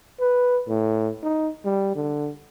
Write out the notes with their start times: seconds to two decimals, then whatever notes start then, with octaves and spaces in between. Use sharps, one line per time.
0.20 B4
0.68 A2
1.23 D#4
1.65 G3
1.95 D3